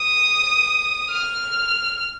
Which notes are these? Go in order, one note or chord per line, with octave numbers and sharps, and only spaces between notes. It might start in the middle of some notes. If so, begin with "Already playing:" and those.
Already playing: D#6
F6